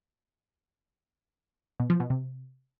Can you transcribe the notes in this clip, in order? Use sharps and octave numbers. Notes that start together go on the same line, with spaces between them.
B2
F3
B2
C3